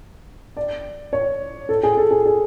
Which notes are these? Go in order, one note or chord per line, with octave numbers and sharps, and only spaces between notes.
D5
C#5
A4
G#4
A4
G#4
G#4